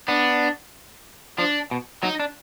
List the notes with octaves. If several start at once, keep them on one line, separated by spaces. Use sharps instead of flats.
B3 D4
F3 D4
B2
F#3 D#4
D4